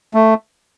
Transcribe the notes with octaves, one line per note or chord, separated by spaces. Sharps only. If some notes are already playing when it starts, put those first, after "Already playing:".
A3